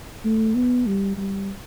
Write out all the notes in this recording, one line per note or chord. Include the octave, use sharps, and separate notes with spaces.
A3
B3
G3
G3